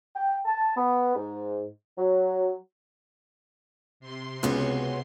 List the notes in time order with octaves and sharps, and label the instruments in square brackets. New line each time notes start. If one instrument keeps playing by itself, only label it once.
[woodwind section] G5
A5
B3
G#2
F#3
[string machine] C3 C6
[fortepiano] C#2 [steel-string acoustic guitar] B3 C#4 F#4